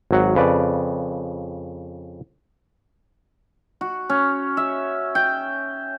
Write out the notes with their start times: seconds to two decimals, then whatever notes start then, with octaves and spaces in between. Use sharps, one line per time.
0.11 G#1 F#3 F#5
0.35 F2 C#3 B4 D5
3.81 F#4
4.10 C#4
4.57 E5
5.15 G5